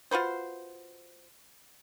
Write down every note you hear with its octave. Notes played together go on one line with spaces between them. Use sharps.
F4 F#4 B4 C5